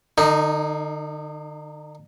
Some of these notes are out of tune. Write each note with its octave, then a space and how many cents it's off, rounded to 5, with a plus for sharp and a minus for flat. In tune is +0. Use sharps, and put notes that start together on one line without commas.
D3 +45 D#4 +0